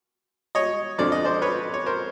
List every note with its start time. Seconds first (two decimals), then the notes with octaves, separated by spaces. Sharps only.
0.55 C#5 D#5
0.98 F2 D3 F3 D5
1.12 D#5
1.24 C5 D5
1.42 B4 C#5
1.74 C#5
1.86 A#4 C5